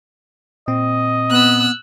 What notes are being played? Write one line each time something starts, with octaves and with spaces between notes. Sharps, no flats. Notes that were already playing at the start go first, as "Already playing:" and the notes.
A#2 C4 D#5
B3 E6 F#6